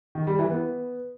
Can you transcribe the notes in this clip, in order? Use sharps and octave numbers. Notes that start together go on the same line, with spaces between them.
D#3
G3
E3
B3